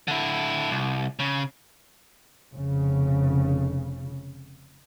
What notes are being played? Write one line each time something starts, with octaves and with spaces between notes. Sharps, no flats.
D3 E4
C2
C#3
F1 C#3